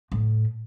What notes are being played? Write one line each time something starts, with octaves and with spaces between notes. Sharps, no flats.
A2